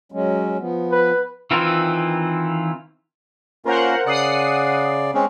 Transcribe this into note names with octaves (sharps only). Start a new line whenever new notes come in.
F#3 G#3 C#4
F3 B3
B4
D#3 E3 C4 E4 F4
A#3 C#4 F4 A#4 C5 F#5
C#3 D5 F#5 D#6 C7
G#3 C4 C#4